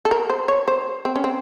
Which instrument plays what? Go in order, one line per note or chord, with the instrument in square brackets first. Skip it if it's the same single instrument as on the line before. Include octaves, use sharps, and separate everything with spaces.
[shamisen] A4
A#4
C5
C#5
C5
C4
C#4
C4